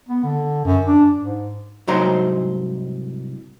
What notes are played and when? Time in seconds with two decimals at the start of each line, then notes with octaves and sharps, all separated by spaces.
0.09 B3
0.24 D3
0.65 F#2
0.85 D4
1.18 G#2
1.87 C2 G#2 F#3 D#4 C5 A#5